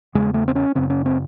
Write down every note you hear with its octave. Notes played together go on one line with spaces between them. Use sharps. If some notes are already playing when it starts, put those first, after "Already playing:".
E2 C#3 G#3
A3
C4
C#4
F#2 C#3 C4
C#4
C4